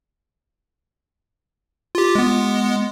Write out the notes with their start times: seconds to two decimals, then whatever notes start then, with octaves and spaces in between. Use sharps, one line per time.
1.95 F4 G4
2.15 G#3 B3